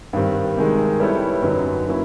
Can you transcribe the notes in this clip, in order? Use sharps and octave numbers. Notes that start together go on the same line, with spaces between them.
G2 D#3 G3 C4
C3 D#3 G#3
G3 B3 E4 A4 C#5
F#2 D3 F#3 B3 D#4
F#3 A#3 C#4 E4